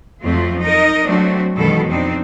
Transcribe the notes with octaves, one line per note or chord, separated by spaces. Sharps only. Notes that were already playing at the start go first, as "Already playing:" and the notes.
F2 F3 F#3 A3 C4 F4
D#4 A#4 D#5
F#3 A3 C4 D4 F#4
F#2 B2 D#3 E3 G#3 A4
F2 C4 D4 D#4